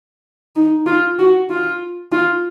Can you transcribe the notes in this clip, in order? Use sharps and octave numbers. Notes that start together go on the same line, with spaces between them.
D#4
F4
F#4
F4
F4